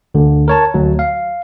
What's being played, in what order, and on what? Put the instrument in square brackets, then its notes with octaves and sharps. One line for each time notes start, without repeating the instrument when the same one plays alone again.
[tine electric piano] D2 D3
A#4 C#5 A5
D2 F#3
F5